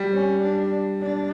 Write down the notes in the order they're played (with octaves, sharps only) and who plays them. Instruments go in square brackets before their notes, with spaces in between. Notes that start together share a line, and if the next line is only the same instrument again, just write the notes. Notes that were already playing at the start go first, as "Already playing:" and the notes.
Already playing: [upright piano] G3
[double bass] C#4
D4
D4